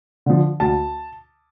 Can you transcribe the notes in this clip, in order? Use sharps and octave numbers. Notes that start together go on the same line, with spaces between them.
D3 F3
D2 A5